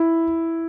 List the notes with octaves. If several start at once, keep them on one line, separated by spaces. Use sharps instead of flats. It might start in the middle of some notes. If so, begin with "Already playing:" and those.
Already playing: E4